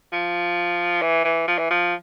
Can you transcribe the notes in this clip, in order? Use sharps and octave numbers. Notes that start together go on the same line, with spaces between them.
F3
E3
E3
F3
E3
F3